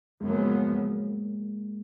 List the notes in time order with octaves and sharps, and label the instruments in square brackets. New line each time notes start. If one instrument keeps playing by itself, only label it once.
[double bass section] F#2 C#3 F3 B3 [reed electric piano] G#3
[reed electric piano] A#3
G#3